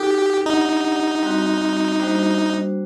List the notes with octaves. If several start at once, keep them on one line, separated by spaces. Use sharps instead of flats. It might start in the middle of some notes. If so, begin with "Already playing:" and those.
Already playing: D#4 F#4 G4 A4
D4 D#4 G4 D5 F#5
G3 C4 F#4
G3 A#3 D4 F#4 C5